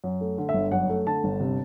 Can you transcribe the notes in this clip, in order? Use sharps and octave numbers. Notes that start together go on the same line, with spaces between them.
F#2
A3
D3
E5
G1
F#2 F#5
A3
D3 A5
G1
C3